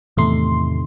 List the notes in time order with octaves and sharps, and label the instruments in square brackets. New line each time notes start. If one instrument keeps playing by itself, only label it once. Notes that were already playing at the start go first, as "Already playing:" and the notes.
[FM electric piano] E2 A3 C6 [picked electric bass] A2 C3 D#3